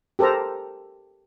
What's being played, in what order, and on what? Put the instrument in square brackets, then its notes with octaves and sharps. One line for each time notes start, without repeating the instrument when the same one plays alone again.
[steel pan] G4 A4 A#4 C5 A#5